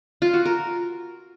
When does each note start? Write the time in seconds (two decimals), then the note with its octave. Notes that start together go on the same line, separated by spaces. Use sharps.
0.22 F4
0.34 F#4
0.45 A#4